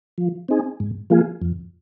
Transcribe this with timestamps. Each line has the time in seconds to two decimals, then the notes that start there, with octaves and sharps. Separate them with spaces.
0.18 F3
0.48 C4 D#4 G#4
0.80 G#2
1.10 F3 A#3 F4 G#4
1.42 F2